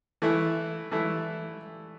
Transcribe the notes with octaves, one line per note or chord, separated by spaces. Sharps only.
E3 A3 E4
E3 A3 E4